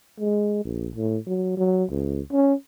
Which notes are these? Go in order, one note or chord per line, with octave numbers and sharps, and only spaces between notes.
G#3
A#1
A2
F#3
F#3
C#2
C#4